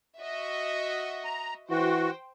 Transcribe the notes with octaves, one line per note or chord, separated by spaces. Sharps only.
F#4 D#5 E5
A#5
E3 F#4 C5 G5